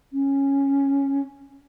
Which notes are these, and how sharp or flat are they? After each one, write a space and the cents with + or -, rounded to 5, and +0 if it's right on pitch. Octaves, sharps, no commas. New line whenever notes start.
C#4 -5